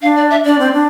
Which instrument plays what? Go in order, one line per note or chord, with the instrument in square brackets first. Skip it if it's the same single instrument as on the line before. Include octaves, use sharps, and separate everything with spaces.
[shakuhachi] D4 [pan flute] F5
[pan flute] D5
E5
[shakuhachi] D4 [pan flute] D5
[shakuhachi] C4
D4